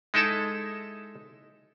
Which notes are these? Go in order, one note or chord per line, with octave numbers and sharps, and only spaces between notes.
G#3 D#4 E4 A4 E5 A5